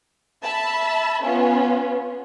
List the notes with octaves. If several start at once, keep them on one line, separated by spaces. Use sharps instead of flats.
E5 A5 B5
B3 C#4 F4